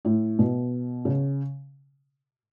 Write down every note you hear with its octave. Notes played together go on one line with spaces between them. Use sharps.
A2
B2
C#3